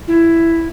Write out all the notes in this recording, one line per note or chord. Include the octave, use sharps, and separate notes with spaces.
E4